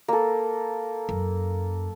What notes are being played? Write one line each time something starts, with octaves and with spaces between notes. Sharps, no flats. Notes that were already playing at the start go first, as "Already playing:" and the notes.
A#3 A4
F#2